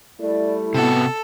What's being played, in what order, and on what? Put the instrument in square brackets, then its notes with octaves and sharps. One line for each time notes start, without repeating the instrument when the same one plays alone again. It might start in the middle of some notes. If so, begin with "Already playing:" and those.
[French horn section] G3 A3 E4 [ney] D5
[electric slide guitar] C3 F#4 [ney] B3 [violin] A4